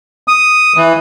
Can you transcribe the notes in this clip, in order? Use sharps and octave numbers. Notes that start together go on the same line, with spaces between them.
D#6
E3